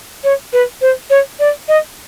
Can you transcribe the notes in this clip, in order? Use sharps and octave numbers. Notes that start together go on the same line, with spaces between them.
C#5
B4
C5
C#5
D5
D#5